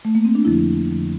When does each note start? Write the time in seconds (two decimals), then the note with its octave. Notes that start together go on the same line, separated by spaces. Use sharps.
0.05 A3
0.15 A#3
0.25 C4
0.35 D4
0.45 F2 D3 F3 E4
0.91 F2 D3 F3